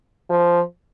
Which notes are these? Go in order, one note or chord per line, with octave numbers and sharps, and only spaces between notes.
F3